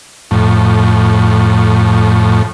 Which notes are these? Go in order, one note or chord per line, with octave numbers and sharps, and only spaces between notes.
F2 A2